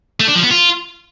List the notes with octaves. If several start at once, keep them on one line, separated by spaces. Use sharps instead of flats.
A3
D4
F3
B3
F4